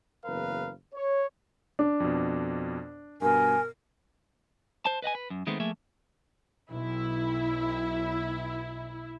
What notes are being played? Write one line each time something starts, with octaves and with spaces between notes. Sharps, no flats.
F#1 E2 A#4 B4 F5
C#5
D4
F2 B2
G2 B2 A#4 G#5
C5 A5
B4 D#5 F#5 G#5
B4
F#2
D#3 G#3 A3 B3 C4
F3 A3 A#3 G#4 E5
B1 E4